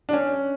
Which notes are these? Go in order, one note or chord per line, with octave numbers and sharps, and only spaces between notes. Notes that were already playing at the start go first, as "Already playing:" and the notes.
D4
C#4